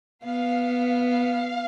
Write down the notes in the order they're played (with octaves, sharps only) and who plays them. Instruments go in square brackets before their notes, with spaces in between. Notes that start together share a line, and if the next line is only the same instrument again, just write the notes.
[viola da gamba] B3 [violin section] F5
[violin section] F5